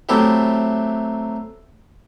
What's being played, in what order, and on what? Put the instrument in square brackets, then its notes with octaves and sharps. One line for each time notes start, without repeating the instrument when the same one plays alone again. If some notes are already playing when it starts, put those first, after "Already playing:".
[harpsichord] F#3 A3 C4 E4 G4